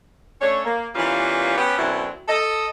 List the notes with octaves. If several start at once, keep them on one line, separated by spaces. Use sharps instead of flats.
A3 C#4 D4 A4 C#5
A#3
E3 G3 A#3 B3 C#4 F4
B3 C#4 G4
F#2 B2 D3 F#3 C4 E4
A4 D#5